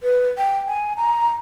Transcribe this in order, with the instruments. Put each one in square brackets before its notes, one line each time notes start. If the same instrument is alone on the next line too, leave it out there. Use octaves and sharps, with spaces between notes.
[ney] B4
G5
G#5
A#5